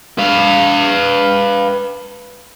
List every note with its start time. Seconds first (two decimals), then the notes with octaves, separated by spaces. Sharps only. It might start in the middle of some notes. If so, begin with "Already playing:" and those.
0.18 B4 F5